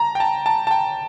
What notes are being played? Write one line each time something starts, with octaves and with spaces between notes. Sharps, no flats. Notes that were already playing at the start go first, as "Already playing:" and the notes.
Already playing: A5 A#5
G5
A5
A5
A5
G5